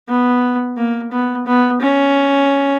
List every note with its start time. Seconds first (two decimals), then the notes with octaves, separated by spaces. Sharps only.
0.08 B3
0.77 A#3
1.11 B3
1.46 B3
1.81 C#4